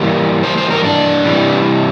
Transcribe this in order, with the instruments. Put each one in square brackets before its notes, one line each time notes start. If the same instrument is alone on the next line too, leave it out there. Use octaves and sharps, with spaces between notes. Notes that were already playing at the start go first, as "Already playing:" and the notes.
Already playing: [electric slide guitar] E3 G3 A#3 A#4
C5
C5
A#4
D4
C3 E3 G3